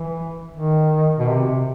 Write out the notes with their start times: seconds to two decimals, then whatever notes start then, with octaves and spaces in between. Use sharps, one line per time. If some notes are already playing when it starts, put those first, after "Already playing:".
Already playing: E3
0.54 D#3
1.18 B2
1.30 C3